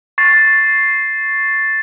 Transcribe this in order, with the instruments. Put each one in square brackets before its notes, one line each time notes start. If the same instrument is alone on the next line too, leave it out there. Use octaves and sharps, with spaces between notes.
[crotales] C#6 A6 C7